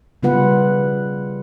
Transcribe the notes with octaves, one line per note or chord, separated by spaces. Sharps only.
C#3 G3 B3 F4 B4 F#5